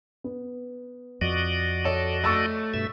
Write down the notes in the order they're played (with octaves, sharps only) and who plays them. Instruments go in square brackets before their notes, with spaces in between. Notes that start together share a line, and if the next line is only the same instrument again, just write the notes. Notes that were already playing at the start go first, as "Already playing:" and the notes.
[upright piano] B3
[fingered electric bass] F2 [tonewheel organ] F#4 D5 D#5
[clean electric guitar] A4 [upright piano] C#5
[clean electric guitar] A3 [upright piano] C#6 E6 A6
[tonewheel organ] G2 B2 E5